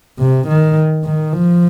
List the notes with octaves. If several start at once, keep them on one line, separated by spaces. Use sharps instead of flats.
C3
D#3
D#3
F3